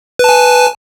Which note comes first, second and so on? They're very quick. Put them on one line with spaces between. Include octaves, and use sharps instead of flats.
B4 A5 G#5